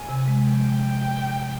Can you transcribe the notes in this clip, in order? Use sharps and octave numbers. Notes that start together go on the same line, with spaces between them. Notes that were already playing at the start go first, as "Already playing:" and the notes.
Already playing: G#5
C3
G#3
F3 G5